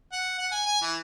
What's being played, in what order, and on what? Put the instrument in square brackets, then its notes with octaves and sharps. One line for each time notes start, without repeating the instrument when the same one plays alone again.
[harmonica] F#5
F#5
G#5
G#5
E3